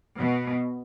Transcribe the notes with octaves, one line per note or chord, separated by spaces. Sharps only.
B2